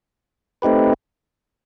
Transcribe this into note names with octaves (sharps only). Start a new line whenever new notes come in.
A3 C4 D#4 G4 B4